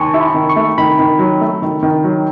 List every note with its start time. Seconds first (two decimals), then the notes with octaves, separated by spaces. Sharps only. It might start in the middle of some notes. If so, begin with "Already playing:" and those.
Already playing: D#2 G#5 A5 C#6
0.14 E4
0.20 B5
0.34 D#3
0.49 C#6
0.56 A3
0.78 D#3 B5
0.99 D#3
1.19 F#3
1.41 A3
1.62 D#3
1.83 D#3
2.04 F#3